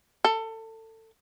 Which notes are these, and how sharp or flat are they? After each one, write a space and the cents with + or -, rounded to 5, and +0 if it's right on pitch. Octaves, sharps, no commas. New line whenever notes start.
A4 +25